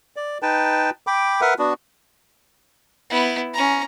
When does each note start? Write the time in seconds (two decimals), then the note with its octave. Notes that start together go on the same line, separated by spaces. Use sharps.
0.16 D5
0.42 D#4 B4 G5 A5
1.07 G5 B5 D6
1.41 A#4 B4 E5 F#5
1.59 B3 D4 F#4
3.10 B3 E4
3.54 C#4 A#5